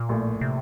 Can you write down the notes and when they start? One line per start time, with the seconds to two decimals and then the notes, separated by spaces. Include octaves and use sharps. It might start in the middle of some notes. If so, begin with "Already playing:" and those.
Already playing: A#2
0.09 A#1 A2 A3
0.41 C3